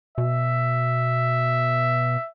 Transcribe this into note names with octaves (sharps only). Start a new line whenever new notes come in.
B2 E5